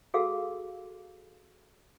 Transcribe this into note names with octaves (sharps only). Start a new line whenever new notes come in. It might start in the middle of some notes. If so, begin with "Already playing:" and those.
F#4 G#4 A4 F5 E6